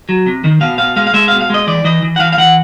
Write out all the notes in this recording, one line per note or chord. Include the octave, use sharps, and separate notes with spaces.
F#3
C3
D#3
B2 F5
B2 F5
G#3 F5
F5
G#3 E5
B2 F5
F5
G#3 D#5
E3 D5
E3 D#5
E3
F#5
E3 F5
F5
E3 F#5